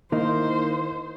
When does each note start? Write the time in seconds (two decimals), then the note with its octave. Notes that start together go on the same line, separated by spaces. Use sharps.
0.12 D#3 A#3 D#4 E4 C5 D#5